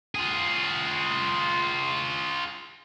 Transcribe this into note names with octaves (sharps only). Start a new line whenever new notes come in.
F4 G#4